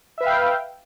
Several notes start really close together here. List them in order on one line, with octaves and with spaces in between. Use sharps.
E5 B4 F5 G5